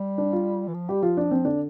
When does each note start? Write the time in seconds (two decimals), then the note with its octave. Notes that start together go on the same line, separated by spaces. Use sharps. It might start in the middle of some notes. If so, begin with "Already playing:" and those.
Already playing: G3
0.18 D4
0.32 F4
0.68 E3
0.74 F3
0.89 G3 G4
1.03 F3 F4
1.17 D4
1.31 F3 C4
1.45 D3 D4